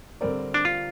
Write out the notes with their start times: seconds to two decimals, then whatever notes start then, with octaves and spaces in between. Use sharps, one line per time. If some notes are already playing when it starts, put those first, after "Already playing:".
0.21 D3 G3 C4 A#4 D5
0.54 D4
0.65 F4